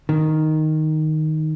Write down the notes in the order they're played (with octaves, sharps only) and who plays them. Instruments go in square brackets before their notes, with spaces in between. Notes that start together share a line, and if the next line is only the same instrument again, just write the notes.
[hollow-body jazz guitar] D#3